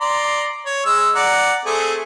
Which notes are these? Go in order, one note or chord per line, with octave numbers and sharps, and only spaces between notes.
D5 A#5 C6
C#5
G#3 E6
D5 F#5 A#5
A3 C4 G#4